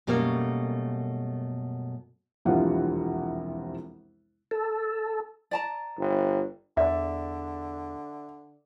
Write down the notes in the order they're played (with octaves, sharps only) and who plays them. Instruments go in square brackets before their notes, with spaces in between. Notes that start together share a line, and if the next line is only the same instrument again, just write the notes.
[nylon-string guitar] F#2 B2 G3 A3 A#3
[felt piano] E1 C2 F2 C3 F4 F#5
[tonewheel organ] A4
[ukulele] D5 A5 A#5
[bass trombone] G1
[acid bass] E2 [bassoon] D3 [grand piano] D5 E5